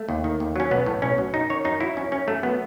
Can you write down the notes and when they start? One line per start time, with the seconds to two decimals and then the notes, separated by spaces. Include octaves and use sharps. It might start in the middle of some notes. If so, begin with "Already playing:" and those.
Already playing: A3
0.09 D#2
0.24 D#3
0.40 D#2
0.56 F#3 C#4
0.71 B1 B3
0.86 A2
1.02 B1 C#4
1.18 F#3
1.34 F#2 D#4
1.50 D#3 C#5
1.65 F#2 D#4
1.80 F#3 E4
1.97 F#2 C#4
2.12 D#3 C#4
2.28 F#2 A3
2.43 F#3 B3